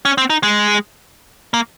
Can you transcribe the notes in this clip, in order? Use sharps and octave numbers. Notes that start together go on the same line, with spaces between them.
C#4
C4
D#4
G#3
A#3